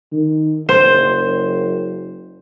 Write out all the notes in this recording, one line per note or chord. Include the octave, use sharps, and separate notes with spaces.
D#3
F#1 C5